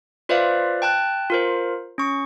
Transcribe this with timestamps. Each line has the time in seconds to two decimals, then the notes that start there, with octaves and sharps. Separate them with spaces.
0.29 F4 B4 C5 D5 E5 F5
0.82 G5 A5 F#6
1.30 F4 A#4 C5
1.98 C#4 C#6